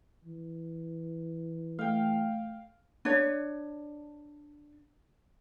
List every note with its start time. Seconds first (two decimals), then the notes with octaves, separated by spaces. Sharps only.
0.25 E3
1.79 A3 F5 G5
3.05 D4 C#5